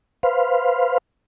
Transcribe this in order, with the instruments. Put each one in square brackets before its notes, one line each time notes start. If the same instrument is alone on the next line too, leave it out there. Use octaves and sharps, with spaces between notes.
[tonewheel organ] B4 C5 F5